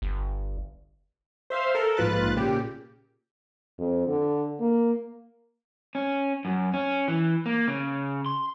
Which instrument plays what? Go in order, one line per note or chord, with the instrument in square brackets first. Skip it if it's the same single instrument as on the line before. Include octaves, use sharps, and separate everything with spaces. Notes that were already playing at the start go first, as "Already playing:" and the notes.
[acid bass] G1
[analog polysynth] C5 E5 F5 C6
A4 A#4
A#1 G#2 F4 B4 F#6 A6
A#2 C#3 G4
[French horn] F2
D3
A#3
[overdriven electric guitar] C#4
F#2
C#4
E3
A#3
C#3
C6